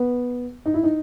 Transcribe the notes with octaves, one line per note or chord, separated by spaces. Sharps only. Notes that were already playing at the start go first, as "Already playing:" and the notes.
Already playing: B3
D#4
E4
D#4